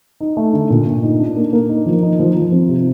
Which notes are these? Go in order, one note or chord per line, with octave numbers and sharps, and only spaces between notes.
D#4
A3
D3
A#2
A#2
D#4
D4
A#3
A#3
D#4
F3
D#4
F3
F3
C4
C3